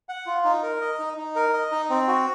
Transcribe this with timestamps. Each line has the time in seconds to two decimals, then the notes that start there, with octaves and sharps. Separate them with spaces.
0.09 F#5
0.26 F4
0.45 D#4
0.63 A#4
0.81 D#5
0.99 D#4
1.18 D#4
1.36 A#4
1.53 D#5
1.72 D#4
1.90 C4
2.08 F#4